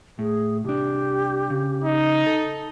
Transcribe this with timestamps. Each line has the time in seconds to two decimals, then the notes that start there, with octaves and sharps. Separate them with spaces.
0.19 A2 G#4
0.64 C2 D4 G4
1.50 C#3
1.84 D#4
2.26 A4